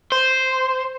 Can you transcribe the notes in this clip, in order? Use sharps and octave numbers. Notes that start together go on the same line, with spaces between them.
C5